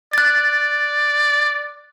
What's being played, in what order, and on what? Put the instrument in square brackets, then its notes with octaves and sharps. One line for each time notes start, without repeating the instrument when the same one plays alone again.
[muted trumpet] D5 [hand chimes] F#6 A6